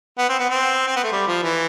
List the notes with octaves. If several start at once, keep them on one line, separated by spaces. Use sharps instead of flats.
B3
C4
B3
C4
C4
B3
A3
G3
F3
E3